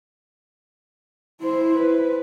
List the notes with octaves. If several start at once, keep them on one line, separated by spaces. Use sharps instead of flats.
E4 C5
B4